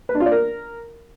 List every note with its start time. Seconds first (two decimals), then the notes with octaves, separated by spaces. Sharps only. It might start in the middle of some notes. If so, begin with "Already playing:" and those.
0.09 B4
0.15 D4
0.20 F4
0.26 D5
0.32 A#4